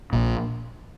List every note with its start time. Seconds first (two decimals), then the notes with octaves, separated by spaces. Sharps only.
0.13 A#1 A#2